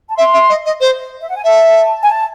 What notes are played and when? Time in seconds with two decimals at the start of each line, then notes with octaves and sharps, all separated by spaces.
0.09 A5
0.17 E5 C6
0.33 E5
0.49 D#5
0.66 D#5
0.81 C5
1.20 E5
1.29 F#5
1.36 G#5
1.44 E5 A5
2.03 G#5
2.06 A5